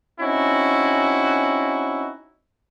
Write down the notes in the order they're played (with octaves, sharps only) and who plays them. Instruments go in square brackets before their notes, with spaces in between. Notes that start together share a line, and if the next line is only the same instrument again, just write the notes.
[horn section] C4 C#4 D#4 E4 F#4